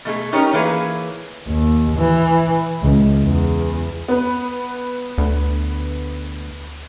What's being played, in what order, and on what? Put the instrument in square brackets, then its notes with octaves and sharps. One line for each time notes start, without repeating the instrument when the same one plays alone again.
[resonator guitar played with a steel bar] B2 A3 G#4
A3 C#4 D#4 G4 A#4 C#5
E3 A#3 E4 G#4 B4 C#5
[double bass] D#2
E3
C#2
E2
[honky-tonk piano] B3 B4
[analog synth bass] D2